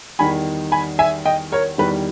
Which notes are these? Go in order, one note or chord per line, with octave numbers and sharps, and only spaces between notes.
E2 D#3 G3 G#5 B5
G#5 B5
E5 G#5
D#5 G5
A#4 C#5
E2 D#3 G3 B4